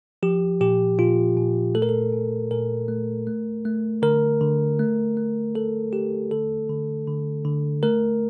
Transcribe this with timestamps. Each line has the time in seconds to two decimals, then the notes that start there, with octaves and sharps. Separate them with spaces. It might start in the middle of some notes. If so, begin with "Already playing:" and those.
0.23 F3 G4
0.61 A#2 G4
0.98 A#2 F4
1.37 A#2
1.75 A3 A4
1.82 A#4
1.89 A4
2.13 A#2
2.51 A#2 A#4
2.88 A3
3.27 A3
3.65 A3
4.02 D3 A#4
4.41 D3
4.79 A3
5.17 A3
5.55 A3 A4
5.93 A3 G4
6.31 D3 A4
6.69 D3
7.07 D3
7.45 D3
7.83 A3 A#4